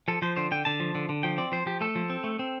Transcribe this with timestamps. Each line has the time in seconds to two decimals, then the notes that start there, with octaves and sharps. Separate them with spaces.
0.08 F3 A4
0.22 F3 C5
0.37 D3 C5
0.51 D3 G5
0.65 D3 A5
0.80 F3
0.95 D3
1.09 D3
1.23 F3 G5
1.38 C4 D5
1.52 F3 C5
1.66 F3 G4
1.81 A3 A4
1.95 F3
2.10 C4
2.24 A3
2.39 C4